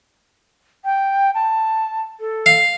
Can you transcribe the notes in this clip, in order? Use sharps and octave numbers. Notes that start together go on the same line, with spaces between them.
G5
A5
A4
F5